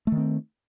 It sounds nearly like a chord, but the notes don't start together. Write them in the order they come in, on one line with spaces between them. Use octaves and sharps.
A3 D#3 C4